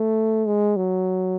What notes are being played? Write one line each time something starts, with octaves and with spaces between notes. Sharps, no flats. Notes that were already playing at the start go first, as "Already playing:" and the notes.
Already playing: A3
G#3
F#3